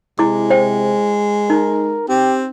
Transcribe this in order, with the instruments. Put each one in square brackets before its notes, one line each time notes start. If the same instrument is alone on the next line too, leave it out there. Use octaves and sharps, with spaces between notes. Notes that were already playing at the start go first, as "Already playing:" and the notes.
[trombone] C3 [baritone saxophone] G#3 [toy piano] E4 D6
[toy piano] C5 G5
[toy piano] D#4 [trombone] A#4
[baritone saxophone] C4 [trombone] G4